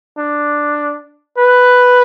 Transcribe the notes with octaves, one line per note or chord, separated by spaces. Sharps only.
D4
B4